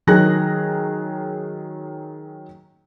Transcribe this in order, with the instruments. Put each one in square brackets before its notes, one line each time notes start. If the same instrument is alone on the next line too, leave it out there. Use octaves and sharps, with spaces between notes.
[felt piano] D#3 F#3 G#4 G#5 F#6 A#6